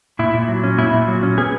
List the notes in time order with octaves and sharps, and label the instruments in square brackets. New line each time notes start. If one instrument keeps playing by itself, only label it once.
[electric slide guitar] A#2 E4
A#2
F#3
C#4
A#2 E4
A#2
F#3
C#4
B3 G#4